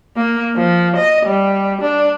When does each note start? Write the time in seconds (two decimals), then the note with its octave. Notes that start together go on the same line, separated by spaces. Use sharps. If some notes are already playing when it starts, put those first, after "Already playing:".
0.16 A#3
0.56 F3
0.96 D#5
1.25 G3
1.81 D4